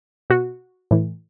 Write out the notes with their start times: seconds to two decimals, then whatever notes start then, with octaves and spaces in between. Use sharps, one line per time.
0.30 B2 F#4
0.91 A2 E3